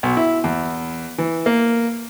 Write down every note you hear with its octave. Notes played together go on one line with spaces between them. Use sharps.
B1
E4
E2
E3
A#3